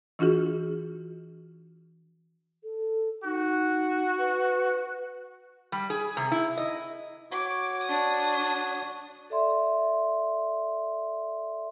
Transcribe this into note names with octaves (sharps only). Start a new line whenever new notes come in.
E3 D4 F4 F#4 G#4
A4
D#4 F#4
B4
G3
G#4
C3
E4
D#5
F#4 C#5 D6
D4 D#6
A4 D5 E5 C6